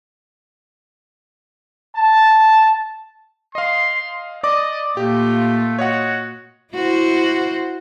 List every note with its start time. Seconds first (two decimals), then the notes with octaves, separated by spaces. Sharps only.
1.97 A5
3.55 D#5 F5 C6
4.43 D5 D#5 D6
4.97 A#2 A3 F4 G4
5.79 F#4 C#5 D#5 F#5
6.74 E4 F#4 C5